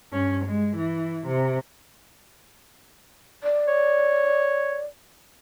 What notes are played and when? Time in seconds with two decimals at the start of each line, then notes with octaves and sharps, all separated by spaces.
0.13 G2 C#4
0.45 G#3
0.77 E3
1.27 C3
3.44 D5
3.68 C#5